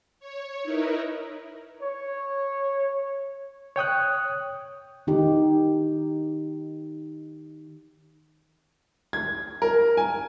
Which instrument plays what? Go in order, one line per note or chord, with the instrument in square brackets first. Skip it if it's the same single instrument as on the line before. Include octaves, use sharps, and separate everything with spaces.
[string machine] C#5
D#4 E4 A#4 B4
[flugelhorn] C#5
[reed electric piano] C#5 G5 D#6 F#6
[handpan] D#3 D#4 G4
[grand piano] G#6
A#4
G#5